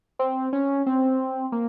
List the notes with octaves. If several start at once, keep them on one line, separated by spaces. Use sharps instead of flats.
C4
C#4
C4
A#3